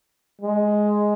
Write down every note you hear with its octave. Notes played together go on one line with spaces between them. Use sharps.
G#3